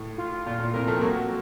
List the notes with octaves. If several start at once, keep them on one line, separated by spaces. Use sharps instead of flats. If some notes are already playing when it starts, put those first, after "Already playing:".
Already playing: A2
F4
A#2 F4
A#2
A2 C3 A#4
F3 A3
C4
F#3 A#3 F#4